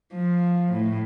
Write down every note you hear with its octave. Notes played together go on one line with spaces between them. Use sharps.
F3
A2